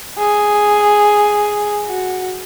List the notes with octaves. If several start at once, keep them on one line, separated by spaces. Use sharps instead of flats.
G#4
F#4